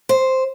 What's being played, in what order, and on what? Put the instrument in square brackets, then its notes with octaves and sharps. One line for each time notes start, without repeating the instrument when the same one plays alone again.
[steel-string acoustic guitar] C5